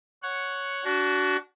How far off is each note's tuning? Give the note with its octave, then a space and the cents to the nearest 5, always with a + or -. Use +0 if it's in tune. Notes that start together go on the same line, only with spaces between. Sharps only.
C#5 +0 F#5 +0
D4 -25 F#4 +15